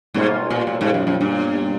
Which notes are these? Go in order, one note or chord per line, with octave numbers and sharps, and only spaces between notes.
G#2 B2 G3 A#3 C#4 F4
A#2
A2
G#2
F#2
F#2
G2